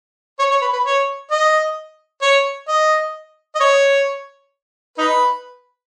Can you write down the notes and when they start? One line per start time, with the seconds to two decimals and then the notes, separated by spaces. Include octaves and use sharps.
0.39 C#5
0.51 C#5
0.62 B4
0.73 B4
0.85 C#5
1.31 D#5
2.22 C#5
2.68 D#5
3.55 D#5
3.60 C#5
4.98 D#4 B4